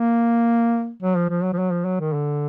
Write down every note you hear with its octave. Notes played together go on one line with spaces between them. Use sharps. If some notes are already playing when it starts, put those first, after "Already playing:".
Already playing: A#3
F#3
F3
F3
F#3
F3
F#3
F3
F#3
D#3
D3